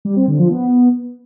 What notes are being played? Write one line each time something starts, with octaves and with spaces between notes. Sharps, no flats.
G3
C4
D3
F3
B3